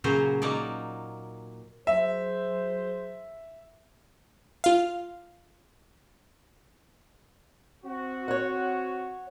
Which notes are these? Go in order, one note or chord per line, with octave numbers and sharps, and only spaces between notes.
A#2 C#3 F#3 C5 A#5
F#3 A#3 D#4 D5
F#3 G#4 C5 E5
F4 F5
C4 F#4
C#5 F#5